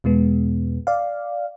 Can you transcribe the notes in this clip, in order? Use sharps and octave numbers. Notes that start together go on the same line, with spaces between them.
E2 B2 G#3 B3
D5 F5